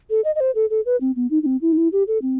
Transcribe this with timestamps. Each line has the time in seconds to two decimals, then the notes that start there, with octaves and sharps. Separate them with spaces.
0.10 A4
0.24 D#5
0.35 D#5
0.40 C5
0.55 A4
0.70 A4
0.86 B4
1.01 C4
1.16 B3
1.31 D#4
1.43 D#4
1.46 C4
1.62 E4
1.72 D#4
1.77 E4
1.93 G4
2.08 A4
2.22 C4